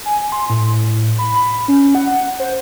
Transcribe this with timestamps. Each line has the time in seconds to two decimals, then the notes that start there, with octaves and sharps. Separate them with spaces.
0.05 G#5
0.32 C6
0.50 A2
1.19 B5
1.35 B5
1.68 C#4
1.95 F#5
2.40 C5